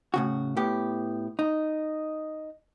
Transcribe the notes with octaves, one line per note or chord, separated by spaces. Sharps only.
A2 C#3 F#4
A2 B3 G4
D#4